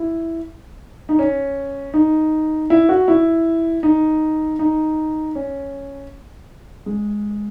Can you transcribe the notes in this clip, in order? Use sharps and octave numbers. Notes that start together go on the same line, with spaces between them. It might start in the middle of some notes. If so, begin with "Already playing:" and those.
Already playing: E4
D#4
C#4
D#4
E4
F#4
E4
D#4
D#4
C#4
G#3